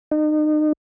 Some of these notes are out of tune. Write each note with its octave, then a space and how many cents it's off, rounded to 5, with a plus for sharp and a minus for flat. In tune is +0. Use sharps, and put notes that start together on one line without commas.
D#4 -35